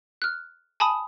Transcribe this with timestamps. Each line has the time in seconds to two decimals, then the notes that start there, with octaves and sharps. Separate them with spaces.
0.22 F6 F#6
0.80 G#5 A5 B5 D#6